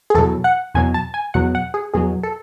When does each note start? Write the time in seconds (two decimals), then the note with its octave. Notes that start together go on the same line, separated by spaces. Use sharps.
0.10 G#4
0.15 E2 B2 F#3 A4
0.44 F#5
0.74 E2 B2 F#3 G#5
0.94 A5
1.14 G#5
1.34 E2 B2 F#3 F#5
1.55 F#5
1.74 G#4
1.94 E2 B2 F#3 G#4
2.23 A4